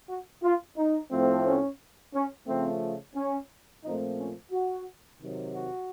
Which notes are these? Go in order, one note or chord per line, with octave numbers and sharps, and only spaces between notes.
F#4
F4
D#4
A2 F3 A3 C4
C#4
C#4
C#3 F3 A3 C4
C#4
A#2 F3 A3 C4 D#4
C#4
F#4
C3 D#3 F#3
F#4